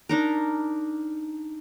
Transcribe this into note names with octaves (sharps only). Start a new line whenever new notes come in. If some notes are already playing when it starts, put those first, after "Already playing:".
D4 D#4 A#4